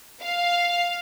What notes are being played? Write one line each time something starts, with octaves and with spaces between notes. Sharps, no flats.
F5